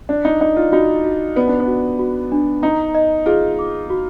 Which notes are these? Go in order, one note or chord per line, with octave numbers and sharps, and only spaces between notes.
D4 D5
D#4
D#4 D5
F4
D#4 F#4
F#4
B3 D5
D4
B3
F#4
F#4
D4
D#4 A#5
D#5
F4 G#4
D6
F#4